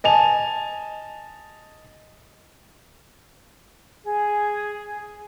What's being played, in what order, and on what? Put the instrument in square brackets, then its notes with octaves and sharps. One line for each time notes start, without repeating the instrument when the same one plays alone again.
[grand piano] D#5 G#5 A5 F7
[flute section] G#4